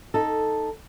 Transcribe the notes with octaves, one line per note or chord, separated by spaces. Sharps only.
D#4 A4